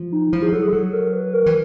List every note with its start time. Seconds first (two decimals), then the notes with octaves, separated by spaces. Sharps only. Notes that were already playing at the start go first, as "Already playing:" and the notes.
Already playing: F3
0.12 D#4
0.32 F3 E4
0.42 G#4
0.52 F#3 A4
0.63 G#4
0.73 F#3 A4
0.93 A#4
1.13 B4
1.34 A#4
1.46 E3